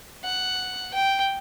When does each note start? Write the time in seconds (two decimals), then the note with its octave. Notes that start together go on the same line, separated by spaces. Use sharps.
0.24 F#5
0.94 G5